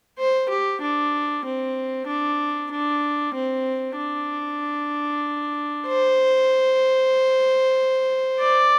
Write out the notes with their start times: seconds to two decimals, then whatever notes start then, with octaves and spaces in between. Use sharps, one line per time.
0.18 C5
0.49 G4
0.82 D4
1.45 C4
2.07 D4
2.72 D4
3.34 C4
3.97 D4
5.87 C5
8.39 D5